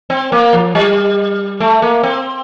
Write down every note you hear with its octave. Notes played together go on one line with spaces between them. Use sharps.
C4
A#3
F3
G3
A3
A#3
C4